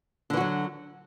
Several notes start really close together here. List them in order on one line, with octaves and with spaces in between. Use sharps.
D3 E3 F#4 F#3